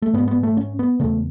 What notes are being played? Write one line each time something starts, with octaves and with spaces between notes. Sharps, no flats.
A3
G#2 B3
B3
A3
C#4
B3
E2 C#3 A3